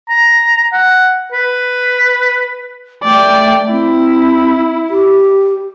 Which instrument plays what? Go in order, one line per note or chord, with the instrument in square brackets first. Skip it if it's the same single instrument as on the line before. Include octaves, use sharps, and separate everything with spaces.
[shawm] A#5
F#5
B4
[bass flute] A3 [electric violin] D5 G5
[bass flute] C4 [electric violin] E4
[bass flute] G4